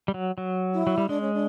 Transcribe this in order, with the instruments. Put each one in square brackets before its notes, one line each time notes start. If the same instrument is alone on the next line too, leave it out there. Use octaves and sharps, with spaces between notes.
[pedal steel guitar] G3
F#3
F#3
[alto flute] E4
[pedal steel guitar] F#3
G3
[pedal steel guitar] G#3 [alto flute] D4
[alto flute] C#4
D4